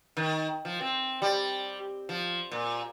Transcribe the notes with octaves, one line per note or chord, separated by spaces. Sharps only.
D#3
F3
C4
G3
F3
A#2